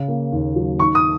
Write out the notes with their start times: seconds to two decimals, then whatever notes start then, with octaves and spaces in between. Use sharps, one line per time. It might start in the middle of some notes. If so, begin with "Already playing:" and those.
Already playing: C#3
0.08 A#3
0.32 D#2
0.56 F#3
0.79 D#3 C#6
0.95 D#6